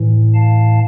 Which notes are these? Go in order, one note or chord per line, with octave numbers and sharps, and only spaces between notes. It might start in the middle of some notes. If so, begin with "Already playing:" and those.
Already playing: A2 E3
F5 A5